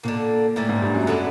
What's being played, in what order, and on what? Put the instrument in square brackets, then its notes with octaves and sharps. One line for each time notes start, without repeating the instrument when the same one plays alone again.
[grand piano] A#2 [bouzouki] F#3 A#3
[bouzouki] D3
[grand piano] A2 [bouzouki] E3 G3 A#3
[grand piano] G#2
G2
F#2
[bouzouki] D3 F#3 B3 E4